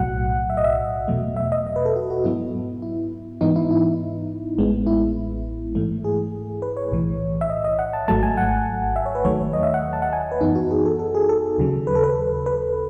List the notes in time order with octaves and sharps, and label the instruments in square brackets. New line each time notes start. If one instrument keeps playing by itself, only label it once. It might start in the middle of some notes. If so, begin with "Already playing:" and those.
Already playing: [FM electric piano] B1 A2 F#3 F#5
E5
D#5
E5
E2 B2 F#3 A3
E5
D#5
D#5
B4
A4
F#4
F#4
G#2 F#3 B3 E4
E4
G#2 E3 B3 D#4
E4
E4
A1 A2 G#3 B3
E4
G#2 E3 A3
G#4
B4
C#5
B1 A2 E3
E5
D#5
D#5
F#5
A5
G#1 G#2 F#3 A3 A5
G#5
F#5
E5
C#5
B4
D#2 D#3 F#3 A3 C#5
D#5
E5
F#5
A5
F#5
G#5
F#5
B4
F#2 E3 B3 D#4
F#4
G#4
A4
A4
G#4
A4
D#2 C#3 F#3
B4
A4
B4
B4